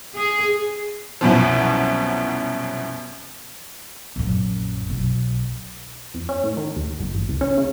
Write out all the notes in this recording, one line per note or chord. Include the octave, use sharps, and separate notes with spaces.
G#4
C2 F#2 B2 F3
A#1 F#2
B1
F2
C#4
A2
D#3
D#2
G1
A1
C#2
C#4
C#3